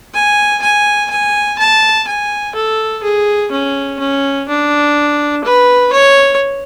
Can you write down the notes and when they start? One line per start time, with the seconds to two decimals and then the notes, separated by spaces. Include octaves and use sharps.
0.14 G#5
0.62 G#5
1.11 G#5
1.59 A5
2.08 G#5
2.55 A4
3.03 G#4
3.51 C#4
3.99 C#4
4.48 D4
5.44 B4
5.93 C#5